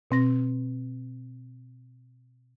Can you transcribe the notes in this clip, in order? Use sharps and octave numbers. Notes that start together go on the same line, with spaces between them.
B2 C4 A#6